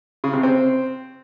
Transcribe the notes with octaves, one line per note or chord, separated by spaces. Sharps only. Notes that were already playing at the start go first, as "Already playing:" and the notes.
C#3
C3
C4